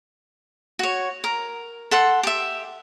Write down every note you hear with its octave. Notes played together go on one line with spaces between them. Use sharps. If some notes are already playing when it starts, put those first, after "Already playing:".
F#4 C#5
A#4
A4 F#5 C6
G4 E5